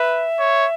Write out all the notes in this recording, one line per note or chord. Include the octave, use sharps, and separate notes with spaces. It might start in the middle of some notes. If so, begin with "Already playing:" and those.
Already playing: B4 E5
C#5